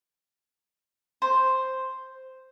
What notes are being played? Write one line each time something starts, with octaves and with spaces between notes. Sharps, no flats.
C5